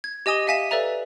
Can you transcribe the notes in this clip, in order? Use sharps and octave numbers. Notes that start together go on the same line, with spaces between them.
G#6
G4 D#5 G#5 D#6 E7 G7
G4 E5 F5 G#5 B6 E7
A4 B4 D5 E5 A#5